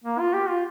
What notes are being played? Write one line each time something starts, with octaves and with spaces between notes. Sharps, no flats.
A#3
F4
G4
F4